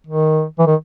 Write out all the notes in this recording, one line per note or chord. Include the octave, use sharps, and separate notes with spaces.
D#3
E3
D#3